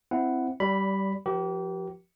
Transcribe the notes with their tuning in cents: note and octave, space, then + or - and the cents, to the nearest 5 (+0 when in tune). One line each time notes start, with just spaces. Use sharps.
C4 +0 E4 +0 F#5 +0
G3 -15 D5 -30 B5 +0
F3 +0 G4 -30 A#4 +40